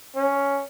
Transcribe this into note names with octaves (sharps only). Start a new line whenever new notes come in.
C#4